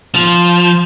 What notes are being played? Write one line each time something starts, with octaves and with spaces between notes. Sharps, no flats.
F3